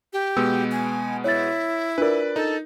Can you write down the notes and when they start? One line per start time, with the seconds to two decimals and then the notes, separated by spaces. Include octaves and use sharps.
0.13 G4
0.37 B2 G#3 B3 E6
0.72 G#5
1.24 E4 C#5 A6
1.98 D4 F4 A#4 B4 D5
2.36 D#4 A4